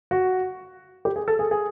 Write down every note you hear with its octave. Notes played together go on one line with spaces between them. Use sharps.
F#4
G4
G#4
A4
G#4
G#4